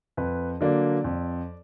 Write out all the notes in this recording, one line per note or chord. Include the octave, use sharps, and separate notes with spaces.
F2 B4
D3 F#3 A#3 D5
F2